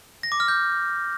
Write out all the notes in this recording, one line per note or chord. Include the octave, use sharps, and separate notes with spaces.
A#6
D6
F6
G6